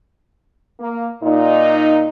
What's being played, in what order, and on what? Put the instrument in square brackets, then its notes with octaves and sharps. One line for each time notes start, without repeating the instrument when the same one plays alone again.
[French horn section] A#3
A#2 D#4